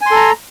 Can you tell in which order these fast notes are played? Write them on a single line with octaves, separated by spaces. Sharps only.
G#5 C6 A4 A#5